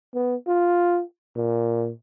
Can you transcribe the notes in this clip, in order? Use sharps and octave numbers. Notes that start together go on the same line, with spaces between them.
B3
F4
A#2